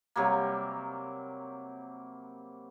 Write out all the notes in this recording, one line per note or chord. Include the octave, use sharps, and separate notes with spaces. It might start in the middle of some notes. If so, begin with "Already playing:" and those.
C3 F#3 G3 A#3